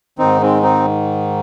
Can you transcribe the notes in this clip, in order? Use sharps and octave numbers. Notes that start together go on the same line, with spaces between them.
G#2 D#3 C4 D#4
G#3 C4
C4 D#4